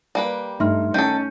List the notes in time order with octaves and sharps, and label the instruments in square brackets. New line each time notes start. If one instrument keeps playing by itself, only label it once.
[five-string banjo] G3 A#3 B4
[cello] G2 [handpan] A3 D#4 [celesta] E5 C6 F6
[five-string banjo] D#3 A4 [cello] C#4 [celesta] G6